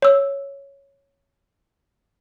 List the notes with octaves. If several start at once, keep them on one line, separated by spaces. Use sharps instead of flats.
C#5 E6